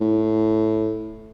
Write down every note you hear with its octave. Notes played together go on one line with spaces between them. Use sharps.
A2